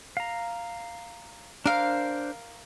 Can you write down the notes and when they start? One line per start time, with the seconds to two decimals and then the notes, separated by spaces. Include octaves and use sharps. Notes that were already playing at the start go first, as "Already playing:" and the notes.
0.17 F5 A#5
1.66 D4 A#4 C5 F5